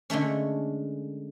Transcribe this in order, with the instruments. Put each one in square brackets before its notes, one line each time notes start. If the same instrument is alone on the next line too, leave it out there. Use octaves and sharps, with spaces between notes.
[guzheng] D3 G#3 A3 C#4